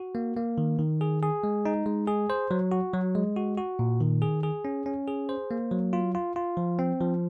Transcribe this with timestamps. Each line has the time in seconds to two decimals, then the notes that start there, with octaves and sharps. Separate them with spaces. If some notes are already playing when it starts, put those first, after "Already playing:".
Already playing: F#4
0.15 A#3
0.37 A#3
0.58 D#3
0.79 D#3
1.01 G#4
1.23 G#4
1.44 G#3
1.66 D#4
1.86 G#3
2.07 G#4
2.30 C5
2.51 F#3
2.72 F#4
2.94 F#3
3.15 G#3
3.36 F#4
3.58 F#4
3.79 A#2
4.01 D#3
4.22 G#4
4.43 G#4
4.65 C#4
4.86 C#4
5.08 G#4
5.29 C5
5.51 A#3
5.71 F#3
5.93 F4
6.15 F4
6.36 F4
6.57 F3
6.79 C4
7.01 F3